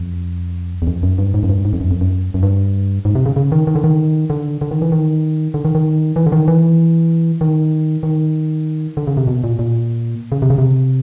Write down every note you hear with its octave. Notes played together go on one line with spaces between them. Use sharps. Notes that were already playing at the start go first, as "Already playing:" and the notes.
Already playing: F2
E2
F2
F#2
G2
G#2
F#2
G2
G#2
F2
F#2
F2
F#2
F#2
G2
G#2
C3
C#3
C#3
D#3
D#3
D3
D#3
D3
D3
D#3
E3
D#3
D3
D#3
D#3
E3
D3
D#3
E3
D#3
D#3
D3
C#3
C3
B2
A#2
A#2
C#3
C3
C#3
C3